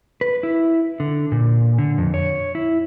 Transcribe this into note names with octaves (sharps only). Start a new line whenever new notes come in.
B4
E4
D3
A#2
D3
F2
C#5
E4